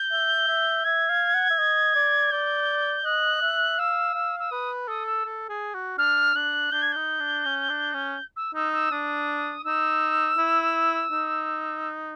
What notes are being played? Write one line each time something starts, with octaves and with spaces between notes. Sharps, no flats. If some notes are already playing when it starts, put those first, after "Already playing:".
Already playing: G6
E5
E5
E5 G#6
F5
F#5
E5
D#5
D5
D5 G6
D#5 F#6
E5
F5 E6
F5
E6
B4 D#6
A4 D#6
E6
A4
G#4
F#4
D4 F6
D4 F#6
D4 G6
G#6
D#4 G6
D4
C#4
D4
C#4
E6
D#4 E6
E6
D4 D#6
D#4 E6
E4
D#4